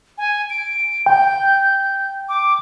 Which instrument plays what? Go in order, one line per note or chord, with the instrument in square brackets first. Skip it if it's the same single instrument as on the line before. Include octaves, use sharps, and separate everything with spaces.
[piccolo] G#5
D7
[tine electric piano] G5 [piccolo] G6
[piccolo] D6